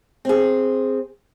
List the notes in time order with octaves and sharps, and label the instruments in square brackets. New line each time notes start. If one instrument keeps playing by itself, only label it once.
[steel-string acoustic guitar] C4 G#4